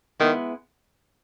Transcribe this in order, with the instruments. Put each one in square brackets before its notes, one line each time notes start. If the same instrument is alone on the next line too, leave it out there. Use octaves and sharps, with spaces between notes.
[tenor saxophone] D#3 [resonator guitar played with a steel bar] G#3 B3 E4